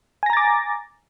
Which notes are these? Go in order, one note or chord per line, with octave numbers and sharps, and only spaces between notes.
G#5 A#5 D6 A6 A#6